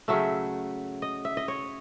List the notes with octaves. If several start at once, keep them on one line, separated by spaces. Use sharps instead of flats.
C#3 F#3 A3 E5
D#5
E5
D#5
C#5